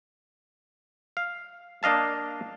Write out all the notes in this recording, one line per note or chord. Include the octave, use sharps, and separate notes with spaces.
F5
A#3 D4 D#5 F5 A5